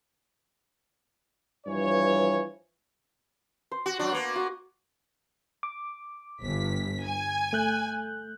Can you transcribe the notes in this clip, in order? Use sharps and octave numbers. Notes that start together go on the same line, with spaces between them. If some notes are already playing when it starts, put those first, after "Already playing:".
G2 E3 F3 C#5
C5
F#4
F#3 D4 F#4
A#3 B3
F#4
D6
G1 B6
G#5
A3 F#6 G6